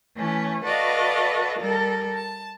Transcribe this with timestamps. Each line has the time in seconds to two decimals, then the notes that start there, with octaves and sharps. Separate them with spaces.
0.16 E3 A3 C#4
0.64 F#4 A4 B4 D5 D#5 F5
1.59 G3 A4 A#4
2.15 A5